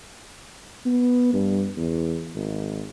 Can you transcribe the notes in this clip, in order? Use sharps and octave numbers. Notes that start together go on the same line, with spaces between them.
B3
G2
E2
G#1